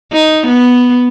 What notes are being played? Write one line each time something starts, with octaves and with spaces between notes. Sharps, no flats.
D#4
B3